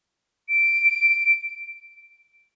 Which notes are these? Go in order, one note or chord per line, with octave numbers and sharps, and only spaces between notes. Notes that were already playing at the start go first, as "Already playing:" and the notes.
D7